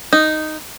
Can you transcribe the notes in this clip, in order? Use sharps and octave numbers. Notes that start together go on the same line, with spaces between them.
D#4